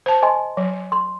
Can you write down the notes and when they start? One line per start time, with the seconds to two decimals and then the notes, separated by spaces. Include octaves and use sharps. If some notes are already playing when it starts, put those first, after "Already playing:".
0.06 C5 A5
0.22 D#5 G#5 C6
0.57 F#3
0.92 C6